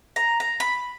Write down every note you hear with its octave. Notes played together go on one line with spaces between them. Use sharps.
A#5
A#5
B5